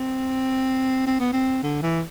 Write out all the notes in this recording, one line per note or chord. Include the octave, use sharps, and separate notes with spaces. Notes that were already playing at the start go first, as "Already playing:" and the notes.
Already playing: C4
C4
B3
C4
D3
E3